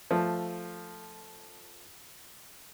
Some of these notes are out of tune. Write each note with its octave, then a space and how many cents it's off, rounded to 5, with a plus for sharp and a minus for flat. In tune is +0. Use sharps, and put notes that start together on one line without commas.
F3 +0 A3 +5